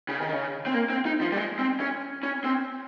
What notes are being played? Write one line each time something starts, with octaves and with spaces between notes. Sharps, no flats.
C#3
D#3
C#3
C4
A#3
C4
D#4
F3
G3
G#3
C4
C#4
C#4
C4